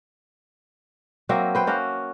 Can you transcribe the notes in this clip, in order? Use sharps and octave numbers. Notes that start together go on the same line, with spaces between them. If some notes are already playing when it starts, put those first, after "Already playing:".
F#3 A#3 C4 E5
B4 C5 G5
A#3 C#4 F#4